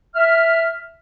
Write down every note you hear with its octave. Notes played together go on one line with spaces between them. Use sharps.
E5 F6